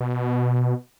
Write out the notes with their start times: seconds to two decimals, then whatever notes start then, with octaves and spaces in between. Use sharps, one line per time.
0.01 B2